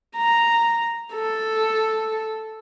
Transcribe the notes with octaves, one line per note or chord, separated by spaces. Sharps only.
A#5
A4